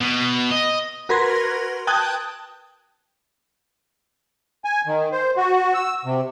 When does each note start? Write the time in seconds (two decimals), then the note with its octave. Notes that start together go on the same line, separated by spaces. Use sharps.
0.01 B2
0.51 D#5
1.09 F#4 A#4 B4 C6 G#6 A#6
1.87 G5 A5 D#6 F#6 G#6
4.65 G#5
4.87 D#3
5.12 C5
5.37 F#4
5.74 E6
6.05 C3